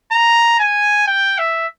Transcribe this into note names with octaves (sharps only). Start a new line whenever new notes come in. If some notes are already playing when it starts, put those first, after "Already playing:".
A#5
G#5
G5
E5